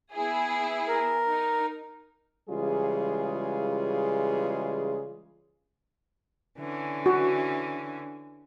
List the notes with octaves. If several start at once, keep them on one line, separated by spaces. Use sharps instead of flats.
B3 E4 G#4
A#4
D#4
C#3 E3 G3 G#3 F4 G#4
D3 E3 C#4
F#4